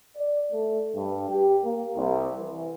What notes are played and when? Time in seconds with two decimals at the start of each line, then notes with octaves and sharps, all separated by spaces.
0.16 D5
0.52 A3
0.95 G2
1.29 G4
1.64 A#3
1.96 C2
2.40 E3